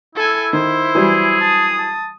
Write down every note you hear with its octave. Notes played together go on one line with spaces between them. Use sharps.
E4 A4 G#5
D#3 C5
E3 F#3 G3 G#4
A5 D#6
A5